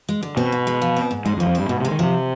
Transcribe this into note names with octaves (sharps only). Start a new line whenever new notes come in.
G#3
D3
B2 C4
G#2
G#3
F3
C4
G#2
G#2 G#3
F2
F3
F2
G2 C4
G#2 B2
C3
G#3
D#3
C3 F3